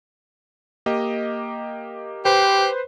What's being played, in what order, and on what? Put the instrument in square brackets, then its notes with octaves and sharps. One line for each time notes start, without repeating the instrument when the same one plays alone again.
[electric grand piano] A#3 G4 D#5
[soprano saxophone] G4 [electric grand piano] B4 C5